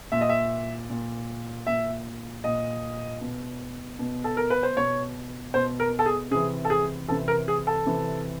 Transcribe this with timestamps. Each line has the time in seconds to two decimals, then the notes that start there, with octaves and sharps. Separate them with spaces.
0.12 A#2 E5
0.21 D#5
0.29 E5
0.90 A#2
1.67 A#2 E5
2.44 A#2 D#5
3.21 B2
3.99 B2
4.24 A4
4.37 A#4
4.50 B4
4.63 C5
4.77 B2 C#5
5.54 B2 C5
5.80 A#4
5.99 A4
6.06 G#4
6.31 C3 E3 G#4
6.65 A4
6.70 G#4
7.08 E3 A4
7.11 C3
7.28 A#4
7.48 G#4
7.67 A4
7.86 C3 E3